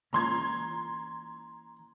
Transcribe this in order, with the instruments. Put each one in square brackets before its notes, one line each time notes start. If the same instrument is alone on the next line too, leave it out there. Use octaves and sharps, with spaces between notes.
[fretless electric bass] E3 A#3 C#4 [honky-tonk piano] A#5 C6 G#6